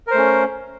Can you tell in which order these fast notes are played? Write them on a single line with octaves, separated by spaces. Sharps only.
A#4 C5 A3 C#4